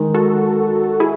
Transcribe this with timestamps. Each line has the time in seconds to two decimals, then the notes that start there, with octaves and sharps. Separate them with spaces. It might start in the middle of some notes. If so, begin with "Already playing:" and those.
Already playing: D#3 G#3 D#4
0.15 F#4 A4
1.00 E4 G#4